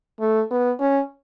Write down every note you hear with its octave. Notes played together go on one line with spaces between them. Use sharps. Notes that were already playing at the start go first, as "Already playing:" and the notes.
A3
B3
C#4